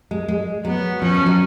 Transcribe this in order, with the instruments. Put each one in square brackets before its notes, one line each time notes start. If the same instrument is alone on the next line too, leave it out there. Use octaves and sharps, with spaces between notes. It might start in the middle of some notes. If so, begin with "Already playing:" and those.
[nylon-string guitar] G#3
G#3
[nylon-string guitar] F#3 [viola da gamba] B3
[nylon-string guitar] F3 [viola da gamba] C#4
[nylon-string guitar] F3
F#3